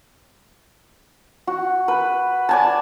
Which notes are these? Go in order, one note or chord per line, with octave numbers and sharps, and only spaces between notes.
F#4
B4
D5 G#5 A5